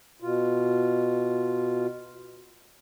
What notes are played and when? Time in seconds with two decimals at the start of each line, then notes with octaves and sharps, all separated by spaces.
0.22 B2 F4